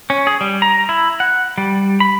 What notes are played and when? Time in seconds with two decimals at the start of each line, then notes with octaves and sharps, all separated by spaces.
0.10 C#4
0.27 G#4
0.41 G3
0.62 A#5
0.89 E4
1.20 F#5
1.58 G3
2.00 B5